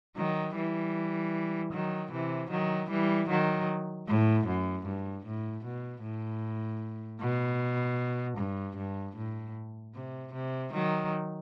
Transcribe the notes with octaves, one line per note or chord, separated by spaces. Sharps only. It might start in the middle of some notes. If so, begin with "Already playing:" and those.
D#3 F#3
E3 G3
D#3 F#3
C3 E3
D#3 F#3
E3 G3
D#3 F#3
A2
F#2
G2
A2
B2
A2
B2
G2
G2
A2
C3
C3
D#3 F#3